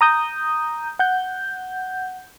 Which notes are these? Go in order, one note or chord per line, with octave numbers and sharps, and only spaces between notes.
A#5 D#6 G6
F#5 G6